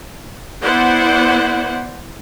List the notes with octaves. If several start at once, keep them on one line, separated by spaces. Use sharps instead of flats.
B3 E4 C5 D5 F#5